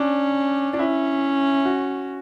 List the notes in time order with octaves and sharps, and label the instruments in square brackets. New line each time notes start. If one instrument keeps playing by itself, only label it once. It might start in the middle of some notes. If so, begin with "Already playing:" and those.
Already playing: [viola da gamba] C#4 [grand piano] D4
[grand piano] D4
[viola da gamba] C#4 [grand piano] E4
[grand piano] F#4